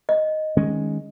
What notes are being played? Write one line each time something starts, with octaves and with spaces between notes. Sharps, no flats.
D#5
D#3 G#3 C#4